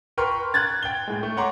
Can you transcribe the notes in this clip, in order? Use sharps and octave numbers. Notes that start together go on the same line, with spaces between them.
A#4 B4 G5 C6 C#6 F6
F#6 G#6 A6
G5 G7
A2 G#3
A3
C#5 F#5 A#5 C6 D6